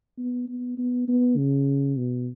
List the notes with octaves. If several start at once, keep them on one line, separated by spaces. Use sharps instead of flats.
B3
B3
B3
B3
C#3
B2